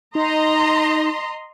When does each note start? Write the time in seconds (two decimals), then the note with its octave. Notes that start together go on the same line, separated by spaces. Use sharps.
0.15 D#4 D#5 A#5 C6